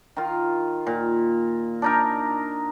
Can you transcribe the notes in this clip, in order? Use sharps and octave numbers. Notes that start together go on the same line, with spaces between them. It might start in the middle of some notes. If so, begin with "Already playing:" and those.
D#3 F4
A#2
D4 D#4 A#4